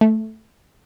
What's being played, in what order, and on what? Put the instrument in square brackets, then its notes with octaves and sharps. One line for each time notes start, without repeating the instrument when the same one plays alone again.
[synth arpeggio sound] A3